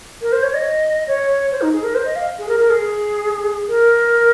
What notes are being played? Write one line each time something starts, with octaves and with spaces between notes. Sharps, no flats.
A#4
C5
C#5
D#5
C#5
C5
D#4
G#4
A#4
C5
D#5
F5
G#4
A#4
A#4
G#4
A#4